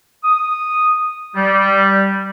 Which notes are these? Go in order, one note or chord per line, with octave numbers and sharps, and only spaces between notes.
D#6
G3